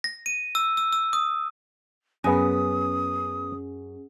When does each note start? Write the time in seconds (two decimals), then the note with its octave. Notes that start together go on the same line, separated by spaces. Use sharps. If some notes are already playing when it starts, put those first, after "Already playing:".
0.04 A#6
0.26 D#7
0.55 E6
0.77 E6
0.93 E6
1.13 D#6
2.24 F#2 B3 C#4 G#4 G#5 D#6